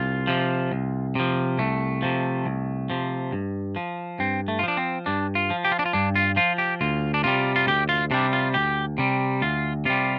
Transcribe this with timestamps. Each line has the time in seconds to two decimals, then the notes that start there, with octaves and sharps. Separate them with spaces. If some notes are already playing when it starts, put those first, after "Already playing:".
Already playing: C2 F4
0.27 C3 F3
0.72 C2
1.15 C3 F3
1.58 C2 A3
2.02 C3 F3
2.45 C2
2.90 C3 F3
3.32 G2
3.76 F3
4.19 G2 C4
4.48 A3
4.59 F4
4.63 F3 D4
4.77 C4
5.06 G2 D4
5.35 F4
5.50 F3
5.65 G4
5.72 F4
5.79 D4
5.86 F4
5.93 G2 D4
6.16 F4
6.36 F3 F4
6.58 G4
6.81 D2 F4
7.14 D4
7.24 C3 G3 F4
7.56 F4
7.67 D2 G4
7.89 F4
8.11 C3 G3 D4
8.33 F4
8.54 D2 G4
8.98 C3 G3
9.42 D2 F4
9.85 C3 G3 F4